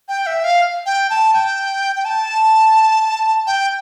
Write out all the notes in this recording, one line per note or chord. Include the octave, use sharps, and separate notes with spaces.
G5
E5
F5
G5
A5
G5
G5
A5
G5